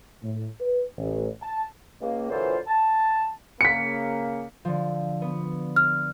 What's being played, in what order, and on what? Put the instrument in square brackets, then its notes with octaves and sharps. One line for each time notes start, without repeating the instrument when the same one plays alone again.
[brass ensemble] A2
B4
A1
A5
[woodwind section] C#2 A#3
A#2 D3 E3 F#3 F4 C5
A5
[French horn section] C#3 A#3 [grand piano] B6 C#7
[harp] D3 F3
B3
[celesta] F6